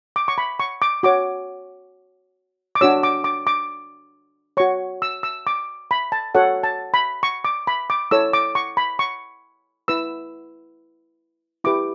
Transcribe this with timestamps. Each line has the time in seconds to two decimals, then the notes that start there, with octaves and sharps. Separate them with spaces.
0.16 D6
0.28 C#6
0.38 B5
0.60 C#6
0.82 D6
1.03 F#4 C#5 D6
2.75 D6
2.81 D4 F#4 C#5 E6
3.03 D6
3.24 D6
3.47 D6
4.57 F#4 C#5 C#6
5.02 E6
5.23 E6
5.47 D6
5.91 B5
6.12 A5
6.35 F#4 A4 C#5 F#5
6.63 A5
6.94 B5
7.23 C#6
7.45 D6
7.67 B5
7.90 D6
8.11 E4 A4 C#5 E6
8.33 D6
8.55 C#6
8.77 B5
8.99 C#6
9.88 E4 B4 E6
11.64 E4 G4 B4 D6